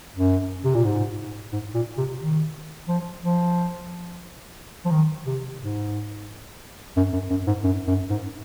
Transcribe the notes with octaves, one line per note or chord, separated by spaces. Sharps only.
F#2
C3
A#2
G#2
G#2
A#2
C3
D#3
F3
F3
F3
D#3
C3
G#2
F#2
F#2
F#2
G#2
F#2
F#2
G#2